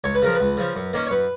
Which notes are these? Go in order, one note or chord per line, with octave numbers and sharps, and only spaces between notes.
C#2 C#5
B4
C#3 F3 A#4
B4
C#2
C#3 F3
F#2
D#3 A#3 C#4
C#5
F#2 B4